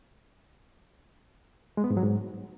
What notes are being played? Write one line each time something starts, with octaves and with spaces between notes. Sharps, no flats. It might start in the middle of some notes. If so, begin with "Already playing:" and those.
G#3
B3
G#2
F#3
G#2